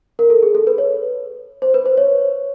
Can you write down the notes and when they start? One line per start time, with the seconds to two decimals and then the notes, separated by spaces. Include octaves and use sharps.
0.19 A#4
0.30 A4
0.43 G#4
0.55 A4
0.67 B4
0.78 C#5
1.62 C5
1.74 B4
1.86 C5
1.97 C#5